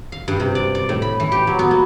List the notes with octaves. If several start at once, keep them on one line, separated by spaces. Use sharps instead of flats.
F5
G2
C3
D5
D5
A2
B5
E3
G4
F#3
B3
A#3